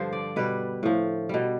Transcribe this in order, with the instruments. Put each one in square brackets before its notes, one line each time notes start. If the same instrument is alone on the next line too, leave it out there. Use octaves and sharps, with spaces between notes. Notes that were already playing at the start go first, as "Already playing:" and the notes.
Already playing: [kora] G2 D3 F3 C5
D5
B2 G3 B4
A2 F3
B2 G3